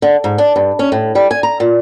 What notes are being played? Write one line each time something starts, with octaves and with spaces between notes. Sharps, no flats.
D3
G#2
D4
G2
C#4
A2
G3
G#5
A#5
A#2